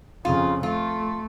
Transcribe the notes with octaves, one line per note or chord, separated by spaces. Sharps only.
F2 C#3 F4
A3 F4